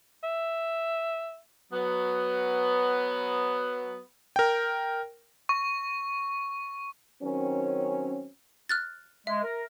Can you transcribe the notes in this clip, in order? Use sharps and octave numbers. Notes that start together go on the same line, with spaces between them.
E5
F#3 B3
A#4 G5
C#6
D#3 F#3 C4 C#4
F6 F#6 A6
G#3 E5
A#4